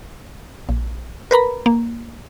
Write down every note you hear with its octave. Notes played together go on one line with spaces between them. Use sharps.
A#1
A#4 B4 A#5 B5
A#3